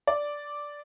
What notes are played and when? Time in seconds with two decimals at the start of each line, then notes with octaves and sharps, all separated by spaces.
0.07 D5